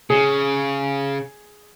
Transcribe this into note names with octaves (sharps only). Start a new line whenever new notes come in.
C#3 G#4